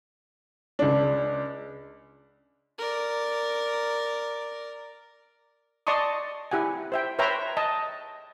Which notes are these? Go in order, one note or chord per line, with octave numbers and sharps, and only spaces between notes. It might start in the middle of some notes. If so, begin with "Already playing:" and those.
C#2 D4
A#4 D5
D5 D#5 A5 C6 C#6 D#6
E4 G4 F#5 G#5
C5 E5 G5
B4 C#5 E5 G5 A#5 C6
D#5 A5